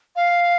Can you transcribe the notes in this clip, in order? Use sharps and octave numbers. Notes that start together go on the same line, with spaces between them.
F5